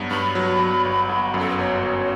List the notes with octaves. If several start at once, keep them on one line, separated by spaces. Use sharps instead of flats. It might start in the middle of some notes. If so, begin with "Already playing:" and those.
Already playing: G2 F#3 B3
G2 B5
F#3
F#3
G1
G1
F#2
A4
B4
G1 C#5
G1